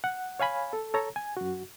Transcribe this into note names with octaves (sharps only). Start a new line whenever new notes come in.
F#5
C#5 F5 G#5 B5
A4
A4 C#5 A#5
G#5
F#2 F#4